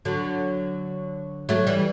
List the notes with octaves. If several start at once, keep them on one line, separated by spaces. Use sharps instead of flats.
D3 F#3
F#3 A3
E3 G3